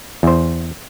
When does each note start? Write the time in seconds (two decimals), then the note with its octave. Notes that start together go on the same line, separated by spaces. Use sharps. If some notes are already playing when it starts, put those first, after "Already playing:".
0.23 E2 C5